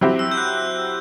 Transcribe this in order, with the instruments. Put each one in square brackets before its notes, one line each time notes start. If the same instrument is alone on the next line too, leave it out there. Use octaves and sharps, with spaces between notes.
[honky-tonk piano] F#3 C4 E4 G4
[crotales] E6
G6
F#6